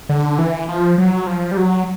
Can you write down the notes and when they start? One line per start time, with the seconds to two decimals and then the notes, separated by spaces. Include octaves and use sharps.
0.09 D3
0.38 E3
0.69 F3
0.98 F#3
1.27 F3
1.52 G3
1.57 F#3